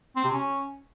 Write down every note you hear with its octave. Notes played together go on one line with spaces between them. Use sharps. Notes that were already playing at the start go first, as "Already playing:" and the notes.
C4
C3
C#4